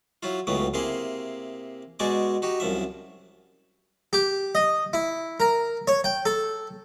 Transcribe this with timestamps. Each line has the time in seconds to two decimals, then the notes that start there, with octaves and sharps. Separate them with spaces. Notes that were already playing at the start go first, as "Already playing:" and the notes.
0.23 F#3 E4 F4
0.47 C#2 A2 C#3 F#3 B3
0.74 C3 A#3 E4 G#4 C6
1.99 B2 G#3 F#4 D5 G#5 D6
2.42 D#4 F#4 G4
2.60 C2 F#2 F3 E5
4.13 G4
4.55 D#5
4.93 E4
5.40 A#4
5.88 C#5
6.04 G5
6.26 A4